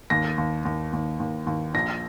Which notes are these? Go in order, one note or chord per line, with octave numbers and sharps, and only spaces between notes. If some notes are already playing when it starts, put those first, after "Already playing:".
D#2 A#6
D#2
D#2
D#2
D#2
D#2
A#1 A#6